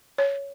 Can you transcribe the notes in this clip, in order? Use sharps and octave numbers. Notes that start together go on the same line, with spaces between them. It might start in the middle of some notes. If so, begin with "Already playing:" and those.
C#5